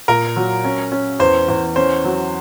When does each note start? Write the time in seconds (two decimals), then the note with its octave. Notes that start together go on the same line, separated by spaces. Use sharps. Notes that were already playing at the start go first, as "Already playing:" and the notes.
0.08 A#2 A#4
0.36 F#3
0.65 C#4
0.92 C#4
1.20 E2 C5
1.48 E2
1.76 C#4 C5
2.05 F#3